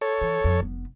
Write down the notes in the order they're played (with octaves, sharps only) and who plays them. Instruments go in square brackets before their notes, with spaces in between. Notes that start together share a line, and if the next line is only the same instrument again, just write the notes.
[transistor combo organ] A4 C#5
[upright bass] E3
F2
F1 B3